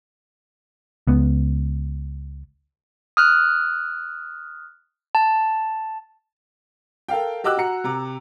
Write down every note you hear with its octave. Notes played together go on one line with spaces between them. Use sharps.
C#2 B3
D#6 F6 F#6
A5
A4 A#4 F5 G5
F#4 G4 D#5 D6 E6 F#6
F#4 A#5 C#7
C3 A#5